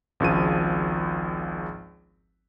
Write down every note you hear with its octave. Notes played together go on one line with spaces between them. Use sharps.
G#1 C#2 F3 D#7